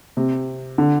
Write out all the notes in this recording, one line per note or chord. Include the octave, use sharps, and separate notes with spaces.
C3
D3